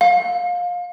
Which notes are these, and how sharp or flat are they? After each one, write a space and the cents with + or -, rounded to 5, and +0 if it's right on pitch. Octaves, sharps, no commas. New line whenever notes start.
F5 +25